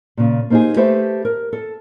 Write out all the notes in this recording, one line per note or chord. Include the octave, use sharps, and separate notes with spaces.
A#2 C#3
A#3 C4 D#4 F4 G4 G#4
A3 G4 A4 B4 C5 E5
A#4
A4